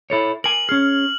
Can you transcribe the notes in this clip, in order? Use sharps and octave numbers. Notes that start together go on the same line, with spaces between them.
E4 A4 C#5
A#4 G#5 F#7
C#4 G#4 F6